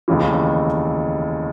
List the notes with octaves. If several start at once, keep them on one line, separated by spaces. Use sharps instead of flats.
F1 D#2 C#3 E3